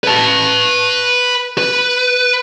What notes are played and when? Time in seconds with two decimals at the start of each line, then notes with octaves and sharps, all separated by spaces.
0.04 B4 A5
1.58 B4